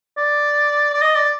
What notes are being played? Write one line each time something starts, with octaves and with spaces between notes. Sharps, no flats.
D5
D5
D#5
D5